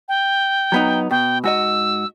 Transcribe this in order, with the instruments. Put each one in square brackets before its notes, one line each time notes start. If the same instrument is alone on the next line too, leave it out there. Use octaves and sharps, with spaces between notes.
[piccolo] G5
[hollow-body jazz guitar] F#3 B3 D#4
[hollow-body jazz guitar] B2 [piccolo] G5
[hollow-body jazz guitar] G#2 F#4 D#5 [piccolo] E6